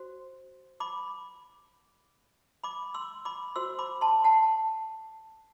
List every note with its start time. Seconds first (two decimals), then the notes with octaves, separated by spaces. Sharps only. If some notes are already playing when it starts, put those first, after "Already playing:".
Already playing: F#4 C5
0.80 B5 D6
2.64 B5 D6
2.94 C6 E6
3.25 B5 D6
3.56 F#4 C5 C6 E6
3.79 B5 D6
4.01 A5 C6
4.24 F#5 A5